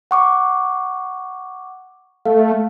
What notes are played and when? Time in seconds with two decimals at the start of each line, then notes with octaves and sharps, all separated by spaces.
0.11 F#5 C#6 D6
2.25 A3 F5